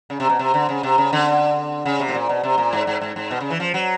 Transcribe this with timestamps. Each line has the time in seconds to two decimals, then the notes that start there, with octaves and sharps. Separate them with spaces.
0.10 C#3
0.20 C3
0.29 B2
0.39 C3
0.54 D3
0.69 C#3
0.83 C3
0.98 C#3
1.13 D3
1.85 C#3
1.99 C3
2.09 A2
2.15 A#2
2.29 B2
2.43 C3
2.58 A#2
2.73 G#2
2.87 G#2
3.01 G#2
3.16 G#2
3.31 B2
3.40 C#3
3.50 E3
3.60 F3
3.74 F#3